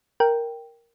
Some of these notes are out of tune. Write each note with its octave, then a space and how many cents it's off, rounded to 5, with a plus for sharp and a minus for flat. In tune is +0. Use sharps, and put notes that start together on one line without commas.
A#4 +0 G5 +0